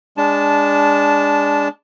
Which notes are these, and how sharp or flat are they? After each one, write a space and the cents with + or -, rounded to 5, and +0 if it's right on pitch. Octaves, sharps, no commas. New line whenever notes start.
G#3 -25 D4 -15 A5 -5